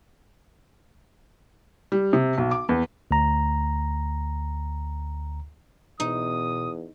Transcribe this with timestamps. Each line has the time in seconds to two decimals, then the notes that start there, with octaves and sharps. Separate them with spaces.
1.92 G3
2.13 C3
2.38 B1
2.51 D6
2.69 E2
3.11 D2 A#5
6.00 E2 B2 D#4 D#6